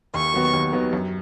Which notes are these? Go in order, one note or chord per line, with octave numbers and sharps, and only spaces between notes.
D#2 C#6
D#3 F#3 B3 F#4
D#2
D#3 F#3 B3 F#4
F#2